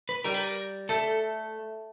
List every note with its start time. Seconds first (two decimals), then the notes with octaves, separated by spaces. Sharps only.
0.09 B4
0.24 G3 A#4
0.34 B4
0.43 A#4
0.89 A3 A4